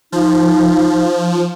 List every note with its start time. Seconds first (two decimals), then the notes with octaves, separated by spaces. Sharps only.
0.12 F3 D#4